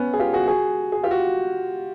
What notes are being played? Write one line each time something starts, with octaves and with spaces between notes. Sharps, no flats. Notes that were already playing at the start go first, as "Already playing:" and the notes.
Already playing: B3 C#4
G#4
F4 G4
F#4 G#4
F#4 G#4
G#4
F4 G4
F#4